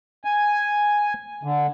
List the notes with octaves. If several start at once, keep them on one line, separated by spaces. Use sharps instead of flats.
G#5
D3